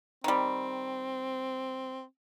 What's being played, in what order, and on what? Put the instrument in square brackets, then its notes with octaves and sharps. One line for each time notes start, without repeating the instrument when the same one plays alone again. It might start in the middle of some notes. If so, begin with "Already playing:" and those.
[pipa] D#3 G3 [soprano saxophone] C4